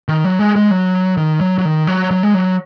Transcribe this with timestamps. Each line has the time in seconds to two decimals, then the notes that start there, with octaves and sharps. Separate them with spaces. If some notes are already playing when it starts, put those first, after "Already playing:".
0.08 D#3
0.24 F#3
0.39 G#3
0.56 G#3
0.71 F#3
1.17 D#3
1.41 F#3
1.58 F#3
1.65 D#3
1.87 F#3
2.11 F#3
2.23 G#3
2.34 F#3